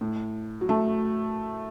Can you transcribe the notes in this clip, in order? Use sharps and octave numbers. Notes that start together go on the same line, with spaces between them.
A2
F#3
A3